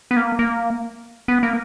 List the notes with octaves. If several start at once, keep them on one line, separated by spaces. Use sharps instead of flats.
B3
A#3
A#3
B3
A#3